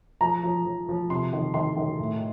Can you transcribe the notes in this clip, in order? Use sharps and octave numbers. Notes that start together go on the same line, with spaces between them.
F3 A#5
F3
F3
F3
C3 C6
D#3
D#3 C6
D#3
A2